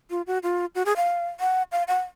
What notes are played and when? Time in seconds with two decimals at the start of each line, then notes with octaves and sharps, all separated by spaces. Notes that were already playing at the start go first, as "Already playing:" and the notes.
0.10 F4
0.27 F#4
0.43 F4
0.75 F#4
0.86 G#4
0.96 F5
1.40 F#5
1.72 F5
1.88 F#5